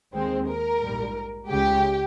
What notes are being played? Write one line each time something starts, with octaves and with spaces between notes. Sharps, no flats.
D#2 D#3 G#3 C4
A#4
A#1 G#2 G3
C#2 C#3 G#3 G4